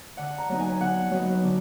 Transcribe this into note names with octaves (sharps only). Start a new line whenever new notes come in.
D3 F#5
A#5
F#3 B3 D#4
G#5
D3 F#5
F#3 B3 D#4
D3